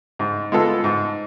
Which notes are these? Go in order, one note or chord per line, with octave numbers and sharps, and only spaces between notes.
G#2
G#3 B3 F4 A4
G#2